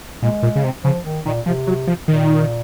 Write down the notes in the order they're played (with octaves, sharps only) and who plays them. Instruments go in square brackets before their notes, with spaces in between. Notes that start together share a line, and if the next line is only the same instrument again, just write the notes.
[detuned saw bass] A#2 [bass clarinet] G#3
[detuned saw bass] A#2
C#3
C3
[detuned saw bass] C#3 [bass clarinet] F3
[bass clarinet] D#3
[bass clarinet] A#2 [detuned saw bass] D#3
[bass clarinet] C3 [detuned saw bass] F3
[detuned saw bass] F#3
F3
[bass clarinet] A#2 [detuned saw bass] D#3